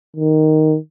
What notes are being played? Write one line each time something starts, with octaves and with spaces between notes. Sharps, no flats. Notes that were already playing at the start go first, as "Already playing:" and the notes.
D#3